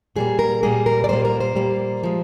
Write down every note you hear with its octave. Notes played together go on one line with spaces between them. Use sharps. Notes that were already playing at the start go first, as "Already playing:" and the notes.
A#2 G3 A#3 G#4
A#4
A#2 G3 A#3 G#4
A#4
D5
A#2 G3 A#3 C5
A#4
C5
A#2 G3 A#3
F3 G#3